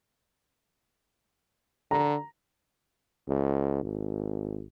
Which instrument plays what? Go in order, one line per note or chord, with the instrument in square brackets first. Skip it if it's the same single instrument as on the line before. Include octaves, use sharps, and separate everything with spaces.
[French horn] D3 [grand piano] A#5
[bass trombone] C#2
G#1